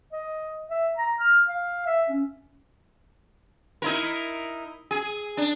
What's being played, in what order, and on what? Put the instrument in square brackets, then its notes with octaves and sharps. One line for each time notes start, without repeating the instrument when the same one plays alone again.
[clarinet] D#5
E5
A#5
F6
F5
E5
C#4
[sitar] D#4 E4 A#4
G#4
D4